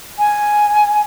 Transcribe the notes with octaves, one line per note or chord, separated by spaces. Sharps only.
G#5